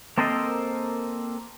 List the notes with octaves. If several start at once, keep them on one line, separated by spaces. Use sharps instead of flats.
A#3 C4 A4 A#4 C5 D#5